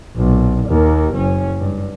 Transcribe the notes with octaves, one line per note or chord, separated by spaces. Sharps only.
B1 A#2
D#2 A#3
F#1 C#4
G2